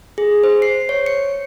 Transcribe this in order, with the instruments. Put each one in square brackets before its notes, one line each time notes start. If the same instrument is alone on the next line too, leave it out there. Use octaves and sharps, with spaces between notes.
[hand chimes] G#4
C5
C7
C#5
C#7